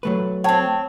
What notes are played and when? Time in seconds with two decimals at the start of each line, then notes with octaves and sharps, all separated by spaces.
0.03 F#3 A3 B4
0.44 C4 C#5 G5 A5